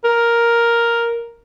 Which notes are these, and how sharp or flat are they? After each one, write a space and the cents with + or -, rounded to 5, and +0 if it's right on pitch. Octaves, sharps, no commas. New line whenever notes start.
A#4 +5